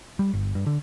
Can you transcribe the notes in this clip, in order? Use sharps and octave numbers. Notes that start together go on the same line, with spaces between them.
G3
G1
G2
D3